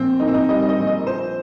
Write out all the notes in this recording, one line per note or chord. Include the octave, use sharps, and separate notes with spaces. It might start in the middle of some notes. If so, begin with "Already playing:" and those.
Already playing: A#1 C4
A#1 D#4
C4
D#4
G3 D#5
D#5
A#1
D#5
F3 C5